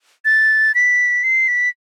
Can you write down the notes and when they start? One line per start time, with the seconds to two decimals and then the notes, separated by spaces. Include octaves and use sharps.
0.25 A6
0.75 B6
1.23 C7
1.48 B6